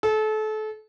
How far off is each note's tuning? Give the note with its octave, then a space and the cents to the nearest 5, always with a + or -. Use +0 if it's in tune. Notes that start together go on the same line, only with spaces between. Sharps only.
A4 -30